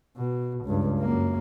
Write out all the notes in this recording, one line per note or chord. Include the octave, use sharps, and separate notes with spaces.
B2
C#2 G2
F#2 A#3